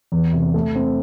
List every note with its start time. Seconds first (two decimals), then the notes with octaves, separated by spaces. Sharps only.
0.12 E2
0.33 C3
0.54 A3
0.75 C4